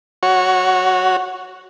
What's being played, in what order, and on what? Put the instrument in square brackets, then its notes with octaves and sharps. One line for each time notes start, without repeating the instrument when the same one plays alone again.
[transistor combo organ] F#4 C#5